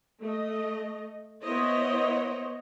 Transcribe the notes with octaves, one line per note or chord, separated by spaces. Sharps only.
A3 D#5
B3 E4 C5 C#5 D#5